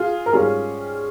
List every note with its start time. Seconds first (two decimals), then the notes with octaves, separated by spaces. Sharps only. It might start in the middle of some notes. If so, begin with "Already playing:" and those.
Already playing: F4 G#4
0.26 A#4
0.33 G#2 G3 C#4 F4 G#4